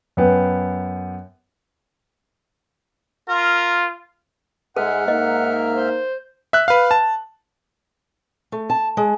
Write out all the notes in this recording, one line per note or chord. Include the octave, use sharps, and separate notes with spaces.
F#2 B3 G5
F4 A#4
G#2 G#3 A4 E5 F#5 F6
A#3 D#4 D#5
C5
E5 F#6
B4 F5
A5
A3
A5
G#3